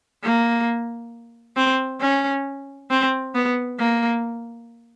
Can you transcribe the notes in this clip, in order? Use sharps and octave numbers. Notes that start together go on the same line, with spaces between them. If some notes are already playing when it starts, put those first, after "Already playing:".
A#3
C4
C#4
C4
B3
A#3